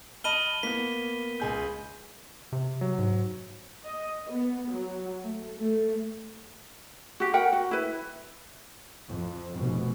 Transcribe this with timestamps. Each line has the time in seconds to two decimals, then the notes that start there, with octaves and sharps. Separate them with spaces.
0.24 D#5 A5 B5 F6 D#7 G7
0.63 A#3 B3 B6
1.40 C#2 G#4 G6
2.52 C3
2.81 F#3
2.98 G#2
3.85 D#5
4.31 B3
4.71 F#3
5.23 A3
5.57 A3
7.20 F#4 G4
7.34 A#4 F#5 G5
7.53 F#4
7.71 E4 B4
9.08 F2
9.57 F1 B2